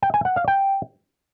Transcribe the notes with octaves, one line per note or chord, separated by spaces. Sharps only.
G5
G#5
F#5
F5
G5